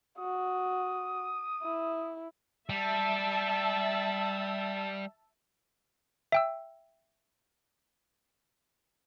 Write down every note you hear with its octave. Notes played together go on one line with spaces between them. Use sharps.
F#4 D#6
E4
G3 E5 A5
E5 G5 E6